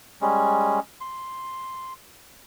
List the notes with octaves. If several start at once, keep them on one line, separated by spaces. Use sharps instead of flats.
G3 G#3 C#4
C6